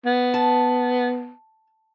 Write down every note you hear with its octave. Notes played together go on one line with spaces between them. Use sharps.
B3
A5